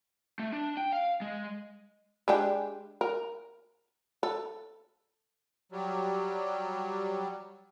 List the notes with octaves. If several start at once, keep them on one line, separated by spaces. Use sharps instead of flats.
A3
D4
G5
F5
G#3
G#3 D4 G4
A#4
A4
F#3 G3